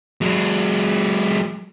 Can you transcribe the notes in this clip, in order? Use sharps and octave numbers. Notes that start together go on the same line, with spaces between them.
F#3 G#3